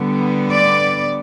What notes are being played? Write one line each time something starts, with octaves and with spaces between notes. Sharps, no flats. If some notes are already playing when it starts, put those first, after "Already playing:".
Already playing: D3 G3 B3
D5